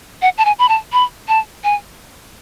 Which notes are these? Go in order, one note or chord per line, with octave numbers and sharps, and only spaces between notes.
F#5
A5
G#5
B5
A5
B5
A5
G#5